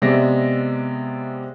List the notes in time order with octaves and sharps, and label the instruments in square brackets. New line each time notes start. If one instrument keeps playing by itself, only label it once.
[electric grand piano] C3 G#3 B3 D5 E5 A#6